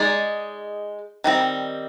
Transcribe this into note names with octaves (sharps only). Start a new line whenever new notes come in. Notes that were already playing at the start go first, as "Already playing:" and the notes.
Already playing: G#3 D#4 G#4 D5
D#3 G3 C4